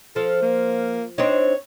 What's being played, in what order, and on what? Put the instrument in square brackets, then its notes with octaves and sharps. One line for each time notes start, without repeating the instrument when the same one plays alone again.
[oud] F3 [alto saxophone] A4
[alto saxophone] A#3
[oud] C4 D4 D#4 [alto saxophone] C#5